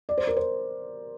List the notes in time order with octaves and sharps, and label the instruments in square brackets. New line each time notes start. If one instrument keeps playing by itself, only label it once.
[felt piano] D5
C5
A#4
C5